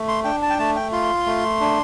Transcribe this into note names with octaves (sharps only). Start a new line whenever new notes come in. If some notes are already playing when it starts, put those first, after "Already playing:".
Already playing: A3
C6
D4 G5
A5
G5
A3 A5
G5
F4 C6
A3
D4